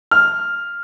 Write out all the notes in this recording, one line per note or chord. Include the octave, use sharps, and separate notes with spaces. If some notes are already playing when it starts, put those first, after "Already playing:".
F6